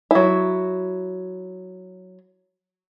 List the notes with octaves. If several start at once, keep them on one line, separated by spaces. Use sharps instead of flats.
F#3 E4